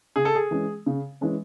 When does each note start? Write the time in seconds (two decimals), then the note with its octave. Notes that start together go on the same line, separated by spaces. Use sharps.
0.16 C#3 G#4
0.25 A4
0.35 G#4
0.51 E3 G#3 C#4
0.86 C#3
1.21 E3 G#3 C#4